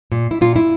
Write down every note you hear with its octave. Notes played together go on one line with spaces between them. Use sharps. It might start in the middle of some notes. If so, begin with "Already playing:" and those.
A#2
E4
A#2 F4
E4